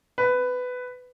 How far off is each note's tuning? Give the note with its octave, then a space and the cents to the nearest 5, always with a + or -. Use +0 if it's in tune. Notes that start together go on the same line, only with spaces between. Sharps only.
B4 +15